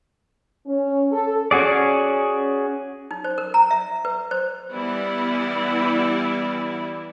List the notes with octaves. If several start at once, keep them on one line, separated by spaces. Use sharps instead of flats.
C#4
A4
C#4 F#4 G#4 D5
D#4
C5
A#4
A#5
E5
B4
C5
E3 G3 B3 E4 D5